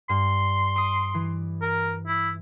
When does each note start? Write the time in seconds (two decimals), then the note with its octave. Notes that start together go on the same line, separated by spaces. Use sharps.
0.09 G2 C6
0.76 D6 D#6
1.14 E3
1.62 A#4
2.08 E4